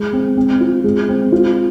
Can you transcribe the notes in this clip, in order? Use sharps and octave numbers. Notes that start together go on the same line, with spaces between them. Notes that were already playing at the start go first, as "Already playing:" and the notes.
Already playing: G#3
C4
C4
F4
G#3
C4
F4